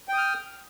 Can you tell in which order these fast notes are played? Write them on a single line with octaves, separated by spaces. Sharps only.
G5 D#6 F6